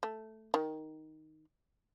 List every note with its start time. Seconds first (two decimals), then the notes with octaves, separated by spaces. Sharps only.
0.03 A3
0.54 D#3